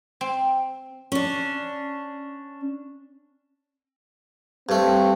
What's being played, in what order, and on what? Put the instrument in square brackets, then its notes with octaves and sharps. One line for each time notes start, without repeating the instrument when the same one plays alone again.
[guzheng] C4
[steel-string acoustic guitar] C#4 D4
[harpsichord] G2 A3 [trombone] C4